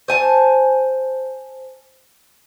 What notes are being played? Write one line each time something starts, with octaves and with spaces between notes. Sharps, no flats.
C5 G#5 A5